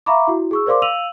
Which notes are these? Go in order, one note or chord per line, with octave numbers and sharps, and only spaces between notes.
E5 F5 A#5 B5 C#6 D6
E4 F#4
G#4 C#6 E6
A#4 C5 D5 F5 C6 D6
F5 E6 D#7 F7 F#7